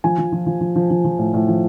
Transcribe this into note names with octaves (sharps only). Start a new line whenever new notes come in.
F3 G#5
F3
F3
F3
F3
F3
F3
F3
A2
A2
F3